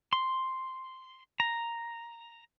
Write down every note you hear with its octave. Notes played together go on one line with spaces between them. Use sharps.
C6
A#5